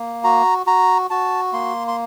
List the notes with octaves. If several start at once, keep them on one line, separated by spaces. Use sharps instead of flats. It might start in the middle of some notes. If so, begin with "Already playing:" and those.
Already playing: A#3
F#4 A#5
F#4 A#5
F#4 A5
A#3 C6
C6